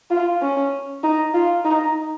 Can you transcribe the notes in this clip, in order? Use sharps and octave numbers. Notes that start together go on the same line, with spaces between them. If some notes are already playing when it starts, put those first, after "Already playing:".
F4
C#4
D#4
F4
D#4